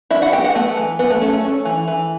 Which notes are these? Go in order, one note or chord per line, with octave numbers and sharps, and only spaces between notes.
D4 E4 E5
F#4 F#5
B3 G4 G5
F#4 F#5
A3 B3 A4
E3
E3 B3 B4
A3 A4
A3 C#4 A4
A3 A4
C#4
E3
E3